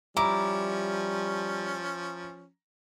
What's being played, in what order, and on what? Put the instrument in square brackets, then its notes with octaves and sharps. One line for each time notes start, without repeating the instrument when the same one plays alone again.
[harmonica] F3 C#4 [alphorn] G3 [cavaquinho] E4 D6 [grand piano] A#5